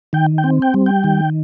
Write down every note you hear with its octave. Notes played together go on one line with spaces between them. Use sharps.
D#3 G5
G5
C4
G5
G3
G5
D#3